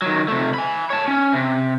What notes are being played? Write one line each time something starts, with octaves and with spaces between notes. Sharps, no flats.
D#3 F#3
C3 A3
G#5 B5
C#5 A5
C#4
C3